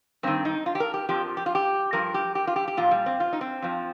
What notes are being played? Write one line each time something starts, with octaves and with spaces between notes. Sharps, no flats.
G2 D#3 C4
D#4
F4
G4
A#4
G4
F2 F3 G4
G4
F4
G4
G2 F3 A#4
G4
G4
F4
G4
G4
A#2 F3 F4
G3
C4
F4
D#4
C4
F2 F3